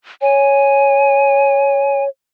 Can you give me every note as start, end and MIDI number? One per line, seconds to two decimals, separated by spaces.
0.22 2.09 73
0.22 2.04 80